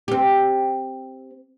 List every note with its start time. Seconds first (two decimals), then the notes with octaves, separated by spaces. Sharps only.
0.08 C4 G4